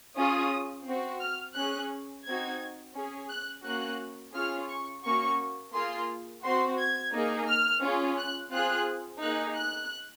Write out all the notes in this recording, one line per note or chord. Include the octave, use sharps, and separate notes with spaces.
C#4 F4 G#4 D#6
C4 F#4
F6
C#4 G#4 F#6
C4 D#4 F#4 G#6
C#4 G#4
F#6
A#3 C#4 F#4 F#6
C#4 F4 G#4 F6
C#6
A#3 C#4 F#4 C#6
A#3 F4 G#4 C6
C4 F#4 C6
G#6
A#3 D#4 G#4
F6
C#4 F4 G#4
F#6
C4 F4 G#4 F#6
A#3 D#4 G#4 F#6
F#6